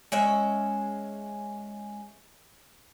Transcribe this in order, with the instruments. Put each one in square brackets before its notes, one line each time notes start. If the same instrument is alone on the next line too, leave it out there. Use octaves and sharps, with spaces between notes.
[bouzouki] G#3 C#4 E5